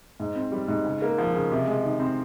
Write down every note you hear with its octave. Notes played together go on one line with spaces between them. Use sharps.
G#2
C4
G3
G#2
C#3
A#3
F3
C#3
C3
G#3
D#3
C4